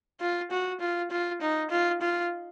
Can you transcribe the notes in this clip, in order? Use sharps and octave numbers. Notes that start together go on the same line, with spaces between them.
F4
F#4
F4
F4
D#4
F4
F4